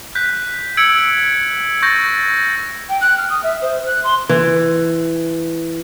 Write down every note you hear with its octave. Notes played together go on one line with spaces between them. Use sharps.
F#6 G6 B6
E6 G#6 C#7 D7 F#7
C#6 G6 A6 A#6
G5
F#6
F6
D#6
E5
C5
F#6
C6
E3